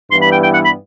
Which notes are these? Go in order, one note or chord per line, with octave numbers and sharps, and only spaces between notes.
G2 E3 G3 B3 E4 C6
B5
G5
G5
F#5
B5